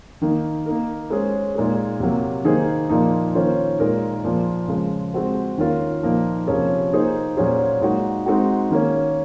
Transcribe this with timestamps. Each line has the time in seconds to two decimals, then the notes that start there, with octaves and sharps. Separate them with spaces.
0.22 D#3 A#3 D#4
0.66 A#3 D#4 A#4
1.10 G#3 C#4 G#4 C5
1.55 A#2 G#3 D#4 G#4
2.00 C3 F#3 A#3
2.44 D#3 A#3 D#4 G#4 C5
2.89 A#2 F3 A#3 D#4
3.35 D#3 A#3 C#4 F4 C5
3.79 A#2 G#3 D#4 A#4
4.24 A#2 F3 A#3
4.68 C#3 F3 G#3
5.13 G#3 C4 F#4 C5
5.58 D#3 A#3 C#4 F4 A#4
6.03 A#2 F3 A#3 D#4 A#4
6.47 C3 F3 A#3 C#4 G#4
6.93 A#3 D#4 G#4 C5
7.37 A#2 F#3 C#4 G#4 C5
7.81 A#2 G#3 D#4 F#4
8.26 G#3 C4 D#4 F#4
8.70 D#3 A#3 C#4